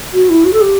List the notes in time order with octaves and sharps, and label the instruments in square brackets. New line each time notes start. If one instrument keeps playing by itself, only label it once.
[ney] F#4
E4
F#4
A4
G4